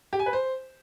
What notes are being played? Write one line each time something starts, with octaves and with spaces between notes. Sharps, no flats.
G4
G#5
B4
C5